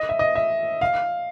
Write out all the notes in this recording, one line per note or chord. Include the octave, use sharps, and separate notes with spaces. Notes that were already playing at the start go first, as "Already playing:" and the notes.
Already playing: D#5
E5
D#5
E5
F5